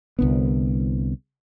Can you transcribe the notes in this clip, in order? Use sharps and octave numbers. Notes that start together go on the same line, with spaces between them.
C2 D3 B3